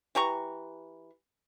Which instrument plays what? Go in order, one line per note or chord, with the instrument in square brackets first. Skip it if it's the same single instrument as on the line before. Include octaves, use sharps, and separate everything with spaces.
[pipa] E3 G4 A#5 C#6